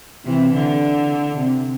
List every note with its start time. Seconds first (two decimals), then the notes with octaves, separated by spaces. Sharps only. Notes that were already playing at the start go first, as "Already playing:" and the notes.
0.25 C3 E3
0.53 D3
1.38 C3